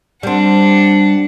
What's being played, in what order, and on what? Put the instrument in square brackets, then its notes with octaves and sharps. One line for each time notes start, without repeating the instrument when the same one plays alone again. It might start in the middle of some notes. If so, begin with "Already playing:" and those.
[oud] G3 C4 [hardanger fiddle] D4 F#5